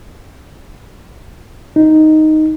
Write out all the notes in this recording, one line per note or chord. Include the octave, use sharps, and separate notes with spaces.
D#4